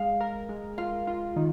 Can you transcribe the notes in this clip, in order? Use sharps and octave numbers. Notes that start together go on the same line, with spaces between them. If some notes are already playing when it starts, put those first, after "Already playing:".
Already playing: G#3 F5
A#4
G#3
F4 F5
F4
D#3